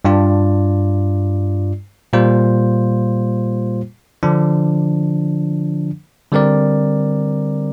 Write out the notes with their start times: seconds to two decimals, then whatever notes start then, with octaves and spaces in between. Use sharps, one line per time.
0.05 G2 G3 D4 F4 D5
2.13 A#2 G3 A#3 F4 C5
4.23 D3 F3 D4
6.32 D3 G3 C4 A#4 D5